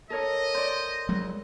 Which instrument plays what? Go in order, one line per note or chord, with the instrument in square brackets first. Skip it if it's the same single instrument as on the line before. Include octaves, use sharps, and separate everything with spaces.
[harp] A4 A#4 C#5 [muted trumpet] D#5
[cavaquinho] C5 [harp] D5 G6
[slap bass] F#3 G#3